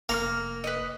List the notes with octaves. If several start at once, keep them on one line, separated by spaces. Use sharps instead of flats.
F1 A#3 A#5 C6 F6
B4 C5 D#5